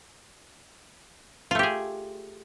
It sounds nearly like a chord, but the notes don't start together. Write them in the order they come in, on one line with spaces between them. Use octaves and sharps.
F4 A3 G4 G#4